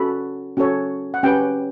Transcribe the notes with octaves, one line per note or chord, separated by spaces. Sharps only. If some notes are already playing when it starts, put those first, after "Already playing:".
Already playing: C#4 F#4 A4 B5
C#4 F#4 A4 C#5
F#5
C#4 G4 B4 G5